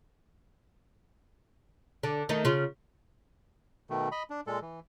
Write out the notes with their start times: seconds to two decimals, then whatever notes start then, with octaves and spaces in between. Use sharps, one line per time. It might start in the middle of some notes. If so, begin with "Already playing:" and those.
2.03 D3 D4
2.29 D#3 A3 D#4
2.45 C#3 F4
3.90 B2 D#3 A3
4.12 D#5 B5
4.30 D4
4.47 A#2 G#3 A4
4.62 E3